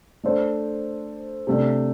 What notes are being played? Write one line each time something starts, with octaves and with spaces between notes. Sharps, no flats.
A3 D4 A4 C5
C3 A3 D4